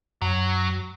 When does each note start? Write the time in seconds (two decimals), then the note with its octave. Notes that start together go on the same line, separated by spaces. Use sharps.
0.22 F#2 F#3